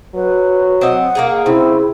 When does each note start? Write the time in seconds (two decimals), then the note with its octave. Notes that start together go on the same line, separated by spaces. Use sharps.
0.14 F#3 B4
0.81 C4 D#5 F#5
1.15 A#3 D#4 G#4
1.46 C#3 C4 E4